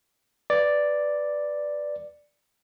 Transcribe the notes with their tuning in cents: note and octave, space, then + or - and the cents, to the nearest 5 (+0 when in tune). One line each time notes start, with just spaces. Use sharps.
B4 +0 D5 +0